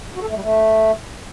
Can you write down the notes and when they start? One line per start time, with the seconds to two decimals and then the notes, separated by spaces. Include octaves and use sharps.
0.15 F#4
0.22 A4
0.28 A3
0.35 G3
0.41 A3